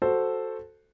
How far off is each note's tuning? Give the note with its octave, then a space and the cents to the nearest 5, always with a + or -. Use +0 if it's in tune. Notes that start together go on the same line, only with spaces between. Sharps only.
F#4 +0 A4 +0 C5 +0